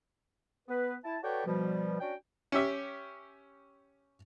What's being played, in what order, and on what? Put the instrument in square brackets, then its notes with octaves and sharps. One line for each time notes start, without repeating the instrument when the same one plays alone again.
[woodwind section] B3 B4
E4 A5
F#4 A4 B4 C#5 D5 G5
B2 F3 G3
C#4 D4 F#4 G5
[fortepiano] C#4 G4 E5